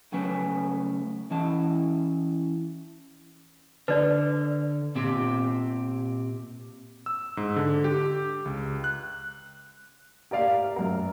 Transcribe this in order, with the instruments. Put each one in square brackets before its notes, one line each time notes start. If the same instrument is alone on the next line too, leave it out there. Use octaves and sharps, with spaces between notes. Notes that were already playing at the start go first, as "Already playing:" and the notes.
[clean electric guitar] C#3 F#3 A3 C#4 B4 G#5
E3 C#4 E4 D#5 A5
[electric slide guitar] D3 [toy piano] B4 D5
[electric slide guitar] A#2 C4 G4
[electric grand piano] E6
G#2
D3
G4
C#2
F#6
[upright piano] G4 A#4 D5 F5
F#2 A#4